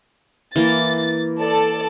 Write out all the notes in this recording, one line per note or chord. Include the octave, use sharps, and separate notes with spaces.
E3 A#3 A6
A4 D5 A5